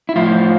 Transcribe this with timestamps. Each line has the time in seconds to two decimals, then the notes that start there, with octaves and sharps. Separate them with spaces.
0.09 E4
0.16 A2 F3 F4